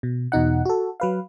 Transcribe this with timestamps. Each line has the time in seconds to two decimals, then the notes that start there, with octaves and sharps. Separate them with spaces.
0.03 B2
0.32 E2 B2 D#4 F#5
0.65 F#4 A4
1.00 F#3 B4 F5